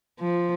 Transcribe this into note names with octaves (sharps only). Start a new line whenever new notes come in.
F3